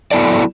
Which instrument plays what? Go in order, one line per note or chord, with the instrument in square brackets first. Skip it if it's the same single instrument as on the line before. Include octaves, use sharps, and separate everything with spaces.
[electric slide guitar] F#3 B3 E4 A4 D5